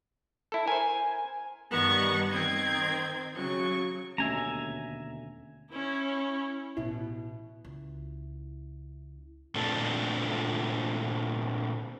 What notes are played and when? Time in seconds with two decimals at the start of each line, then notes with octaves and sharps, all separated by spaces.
0.52 E4 A4
0.68 A#4 C5 G#5
1.71 G2 D#3 G3 B3 F#5 C#6
2.29 D#3 C4 G#6
3.35 C#3 F#3 C#6
4.18 D#2 B2 D3 A3 C#4 E5 G#5 A#5
5.71 C#4 E4
6.77 A1 B2 E4
7.65 C#2
9.55 A#2 A3 C4 D4 F4 A4